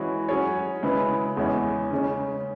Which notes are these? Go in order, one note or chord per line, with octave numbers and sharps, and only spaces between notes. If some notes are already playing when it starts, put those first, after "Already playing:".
Already playing: E3 G#3 C#4 F#4
F#3 C#4 G#4 C#5
C#3 G#3 E4 B4
E2 E3 G#3 C#4 G#4
C#3 G#3 C#4